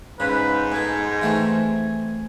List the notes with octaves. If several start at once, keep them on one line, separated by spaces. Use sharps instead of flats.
G#2 C#3 B4
B2 A4 G#5
E3 A3 C4